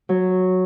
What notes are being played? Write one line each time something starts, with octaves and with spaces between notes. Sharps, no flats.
F#3